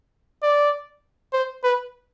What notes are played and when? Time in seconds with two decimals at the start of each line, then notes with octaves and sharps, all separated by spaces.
0.43 D5
1.33 C5
1.64 B4